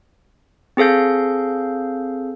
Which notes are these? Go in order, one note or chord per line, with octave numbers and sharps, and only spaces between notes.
C4 G#4 A4 F5 G6